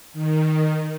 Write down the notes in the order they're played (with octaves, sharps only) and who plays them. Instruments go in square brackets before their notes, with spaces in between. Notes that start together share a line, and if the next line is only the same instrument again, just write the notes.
[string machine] D#3